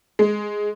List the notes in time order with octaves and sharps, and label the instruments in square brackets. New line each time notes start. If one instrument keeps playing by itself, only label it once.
[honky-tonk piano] G#3